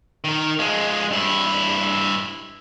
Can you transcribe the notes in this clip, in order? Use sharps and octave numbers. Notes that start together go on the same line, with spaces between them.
D#3 A#4
F3 G#3
G2 E4